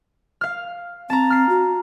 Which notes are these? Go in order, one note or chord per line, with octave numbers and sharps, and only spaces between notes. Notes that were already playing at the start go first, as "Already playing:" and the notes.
F5 F6
C4 A5 A#5
F6 C7
F#4